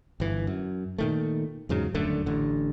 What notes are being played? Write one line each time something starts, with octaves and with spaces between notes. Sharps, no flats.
G1 E3
F#2
A#2 D#3 A3
E2 G#2 C#3 F#3
D#1 F#2 D3 A3
A1 D3